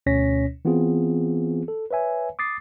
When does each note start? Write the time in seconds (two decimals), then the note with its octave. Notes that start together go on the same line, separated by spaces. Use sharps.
0.06 D2 B2 C#4 C#5 A#6 B6
0.65 E3 B3 C4 F4 G#4
1.68 A4
1.91 B4 C#5 E5 G#5
2.39 D6 D#6 A6 C7